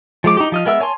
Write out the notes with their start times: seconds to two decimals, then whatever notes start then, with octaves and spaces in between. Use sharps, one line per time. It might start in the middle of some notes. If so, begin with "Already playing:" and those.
0.24 F3 G#3 D6
0.37 D#4 G4
0.52 F3 D#5 F6
0.65 G#3 B3 A#4 E5 E6
0.80 C#5 G#5 A5 C6